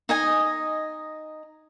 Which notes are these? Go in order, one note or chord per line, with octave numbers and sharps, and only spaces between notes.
D#4 D#5 G#5